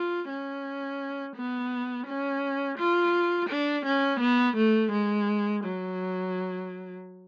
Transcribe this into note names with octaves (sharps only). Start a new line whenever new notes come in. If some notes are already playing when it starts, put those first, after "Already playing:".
Already playing: F4
C#4
B3
C#4
F4
D4
C#4
B3
A3
G#3
F#3